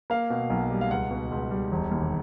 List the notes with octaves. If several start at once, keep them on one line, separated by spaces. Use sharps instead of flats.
A#3 F5
B2
B1
G3
F5
C#2 F#5
B2
C#2
G3
E1
D#2